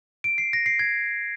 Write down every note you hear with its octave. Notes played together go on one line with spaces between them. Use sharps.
D7
C7
A#6
C7
G#6